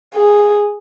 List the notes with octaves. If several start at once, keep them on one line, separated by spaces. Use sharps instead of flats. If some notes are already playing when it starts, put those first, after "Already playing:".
G#4